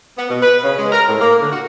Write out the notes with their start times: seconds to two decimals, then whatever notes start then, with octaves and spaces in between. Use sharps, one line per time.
0.18 B3
0.30 B2
0.42 B4
0.63 C#3
0.79 G#3
0.92 A#4
1.09 A2
1.21 A#3
1.41 D3
1.52 F#4